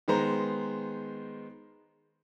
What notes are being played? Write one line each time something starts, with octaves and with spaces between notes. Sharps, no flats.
D#3 G#3 B3 C5 A#5